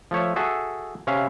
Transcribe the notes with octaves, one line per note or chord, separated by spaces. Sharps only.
F3 A3 C#5 E5
F#4 G#4 A4 E5
C3 C#4 E5 F5